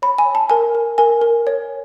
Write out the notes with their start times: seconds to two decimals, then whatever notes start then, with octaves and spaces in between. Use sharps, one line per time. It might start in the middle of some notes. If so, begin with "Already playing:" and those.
0.02 C#5 B5
0.18 G#5
0.26 C#5
0.35 A5
0.50 A#4 G#5
0.75 A#4
0.98 A#4 G#5
1.22 A#4
1.47 C#5